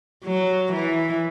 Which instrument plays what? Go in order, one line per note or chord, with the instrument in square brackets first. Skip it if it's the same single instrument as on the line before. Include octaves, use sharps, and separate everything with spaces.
[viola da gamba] F#3
E3